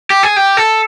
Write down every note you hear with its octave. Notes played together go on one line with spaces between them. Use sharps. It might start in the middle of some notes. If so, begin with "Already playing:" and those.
G4
G#4
G4
A4